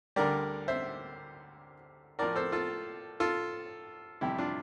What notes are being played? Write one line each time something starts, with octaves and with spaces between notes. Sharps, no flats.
D2 D3 G3 A#4 D5
C5 E5
A2 F3 A#4 D5
A4 C5
F4 A4
F4 A4
F2 C3 E3 G3 E4 G4
D4 F4